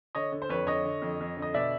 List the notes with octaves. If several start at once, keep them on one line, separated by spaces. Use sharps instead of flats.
D3 C#5 D#5
D3
C5
F2 B4 C#5
D3 C#5 D#5
D3
F2
F2
D3
D#5
B2 D5 E5